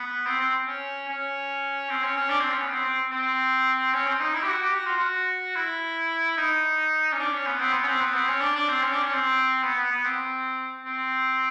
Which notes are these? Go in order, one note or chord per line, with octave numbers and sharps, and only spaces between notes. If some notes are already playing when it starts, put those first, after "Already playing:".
Already playing: B3
C4
C4
C#4
C#4
C4
C#4
C#4
D4
C4
C#4
B3
C4
C4
C4
C#4
C4
D#4
E4
G4
F#4
G4
F#4
F4
F#4
E4
D#4
C#4
D4
C#4
B3
C4
B3
C#4
C4
B3
C4
C#4
D4
D4
C4
C#4
D4
C#4
C4
B3
B3
B3
C4
C4